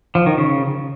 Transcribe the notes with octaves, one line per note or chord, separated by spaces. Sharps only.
F3
D#3
C#3